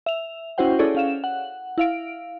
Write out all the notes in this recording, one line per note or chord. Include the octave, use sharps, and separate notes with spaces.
E5 F7
C#4 E4 F#4 C5 F#5 G5
C#4 E4 G#4 A4 C#5 D5
C#4 F5 E7
F#5
E4 F5 D7